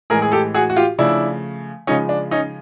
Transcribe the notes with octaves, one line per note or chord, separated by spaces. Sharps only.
A2 E3 G#3 G#4 A#4
G#4
G4 A4
F#4 G#4
F#4
F4 G4
C#3 F3 A3 D4 E4
C#3 F3 G#3 C#4 D#4
D4
C#4 D#4